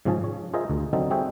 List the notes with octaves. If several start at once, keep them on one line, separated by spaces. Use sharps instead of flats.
G#2 C#3 F3 C#4 G#4 A5
C#5
F4 G#4 A#4 C5 D#5 E5
D2
D3 F#3 C4 D#4 A4
G3 C4 F#4 G#4 E5 G5